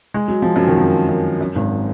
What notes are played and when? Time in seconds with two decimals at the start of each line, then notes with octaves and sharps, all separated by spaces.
0.14 G#3
0.28 F#3
0.42 F3
0.56 F#2 F#3
0.67 D#3
0.77 F2 F3
1.09 F#2
1.41 F#2
1.55 G#1 G#2